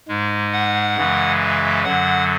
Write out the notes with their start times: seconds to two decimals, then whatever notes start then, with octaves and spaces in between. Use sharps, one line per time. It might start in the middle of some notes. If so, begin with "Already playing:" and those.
0.08 G#2 G#3
0.53 F#5
0.97 F#2 C#3 E3 G#3
1.41 E5
1.84 F#2 D3 F#3 F#5